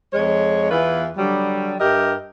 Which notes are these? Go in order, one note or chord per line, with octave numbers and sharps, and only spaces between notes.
F2 G#3 C#5
E2 E3 B3 F4 B4
D3 F#3 G3
G2 G4 A#4 D#5 E5